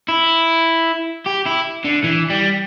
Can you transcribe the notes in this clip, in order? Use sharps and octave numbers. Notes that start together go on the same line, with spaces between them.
E4
G4
E4
D3
E3
G3